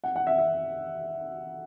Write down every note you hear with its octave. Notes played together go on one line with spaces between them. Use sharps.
F#5
F#5
E5
E5